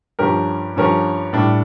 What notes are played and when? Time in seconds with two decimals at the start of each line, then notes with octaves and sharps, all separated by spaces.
0.19 G2 F3 C#4 G4 A#4
0.76 G2 F3 C#4 G4 A#4
1.33 A2 G3 D4